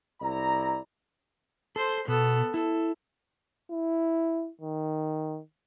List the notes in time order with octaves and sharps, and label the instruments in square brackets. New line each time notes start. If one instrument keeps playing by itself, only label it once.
[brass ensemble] C2 E4 D5 A#5
[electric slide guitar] A4 [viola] C5 C6
[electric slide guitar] B2 [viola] B3 A4
[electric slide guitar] E4 [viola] A4
[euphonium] E4
D#3